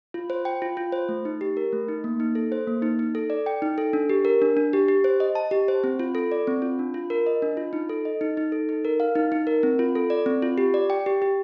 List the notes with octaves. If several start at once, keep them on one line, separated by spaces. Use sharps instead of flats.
F4
C5
G5
F4
F4
C5
A3
D#4
G4
A#4
A3
D#4
A#3
D#4
A4
C5
A#3
D#4
D#4
A4
D5
G5
D#4
A4
D4
G4
A#4
D4
D4
G4
G4
C5
D#5
A5
G4
C5
C4
F4
A4
D5
C4
F4
D4
F4
A#4
D#5
D4
F4
D#4
A4
D#5
D#4
D#4
A4
D#4
A#4
F5
D#4
D#4
A#4
C4
F4
A4
D5
C4
F4
G4
D5
G5
G4
G4